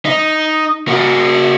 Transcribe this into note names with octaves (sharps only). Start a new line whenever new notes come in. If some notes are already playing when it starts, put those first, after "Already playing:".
D#4
A#3 F#4